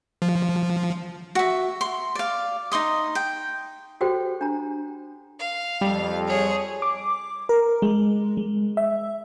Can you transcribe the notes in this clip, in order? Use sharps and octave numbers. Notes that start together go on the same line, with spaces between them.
F3
F#4 E5
C6
D5 F5
D#4 C#5 C6 D#6
G5
F#4 G4 A4 C5 G5
D4 A#5
F5
F2 G3
G#4 C#5
D6
A#4
G#3
G#3
E5